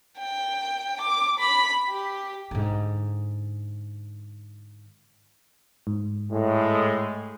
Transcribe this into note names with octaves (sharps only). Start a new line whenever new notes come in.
G5
D6
B5
G4
G#2 D3
G#2
A2 G#3